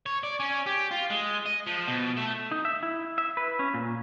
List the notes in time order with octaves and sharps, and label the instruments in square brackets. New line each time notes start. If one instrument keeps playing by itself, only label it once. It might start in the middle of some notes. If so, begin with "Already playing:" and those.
[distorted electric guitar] C#5
D5
C#4
G4
F4
G#3
D#5
F3
B2
A3
[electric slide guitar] D#4
E5
E4
E5
B4
C#4
A#2